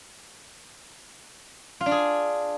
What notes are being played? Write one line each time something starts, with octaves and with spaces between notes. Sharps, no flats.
F4
D4
G#4